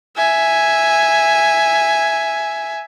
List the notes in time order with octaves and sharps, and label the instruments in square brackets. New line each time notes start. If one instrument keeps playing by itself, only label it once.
[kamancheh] E5 G#5